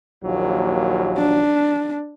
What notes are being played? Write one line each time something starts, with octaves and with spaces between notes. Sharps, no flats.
A#1 D#2 F#3
D4